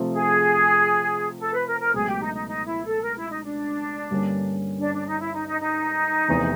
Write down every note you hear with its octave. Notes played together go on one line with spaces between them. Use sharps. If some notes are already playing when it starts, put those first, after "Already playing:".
Already playing: C3 F3 A3 C4
G#4
A4
B4
A#4
A#4
C#2 B2 F#3 A3 G#4
G4
D#4
D#4
D#4
E4
A4
A#4
E4
D#4
D4
G2 D3 G3 A#3 C#4
D4
D4
D#4
E4
D#4
D#4
D#4
F1 E2 C3 E3